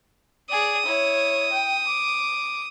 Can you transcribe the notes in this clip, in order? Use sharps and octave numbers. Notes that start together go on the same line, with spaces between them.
G#4 D5 D#6
E4 C#5
G5
D6